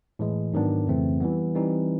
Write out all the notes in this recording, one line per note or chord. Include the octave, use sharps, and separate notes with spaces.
A2 E3 G#3
G#2 D#3 F#3 B3 D4
F2 C#3 E3 A3 C4
E3 G3 B3
E3 G3 C4 D#4